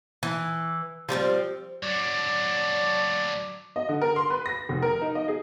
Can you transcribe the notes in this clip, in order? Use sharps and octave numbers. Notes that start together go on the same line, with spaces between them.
E3
F3 G3 A#3 C4
F#3 D4 D5
D#5
D3
A#4
C6
B4
A#6
F1
A#4
D#4
D#5
G#4